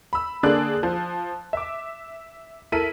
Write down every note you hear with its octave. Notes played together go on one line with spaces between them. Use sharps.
B5 E6
D3 A#3 D4 G#4 D5 F#6
F3
E5 D6
E4 A4 A#4 B6 D#7